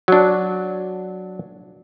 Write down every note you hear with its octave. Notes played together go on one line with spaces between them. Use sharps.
F#3 D4